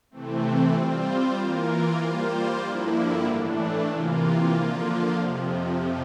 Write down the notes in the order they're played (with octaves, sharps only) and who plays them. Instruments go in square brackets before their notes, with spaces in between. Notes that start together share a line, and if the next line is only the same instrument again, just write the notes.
[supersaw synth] C3 E3 A3 C4
G3 C4 F4 C5
E3 A#3 F4 A#4
G3 A#3 F4 C5
G2 D3 F3 A#3 E4
A2 E3 A3 D4
C3 E3 A#3 F4
D3 F3 A#3 F4
F2 C3 F3